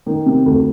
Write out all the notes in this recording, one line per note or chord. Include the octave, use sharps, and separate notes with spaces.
D#3
C3
D2